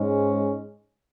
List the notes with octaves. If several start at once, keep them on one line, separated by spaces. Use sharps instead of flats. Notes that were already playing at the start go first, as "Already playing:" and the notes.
Already playing: G#2 G#3 C#4